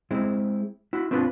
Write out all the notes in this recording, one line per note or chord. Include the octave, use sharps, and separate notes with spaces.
G#3 C4 E4
E4 F#4
C4 D4 F4 B4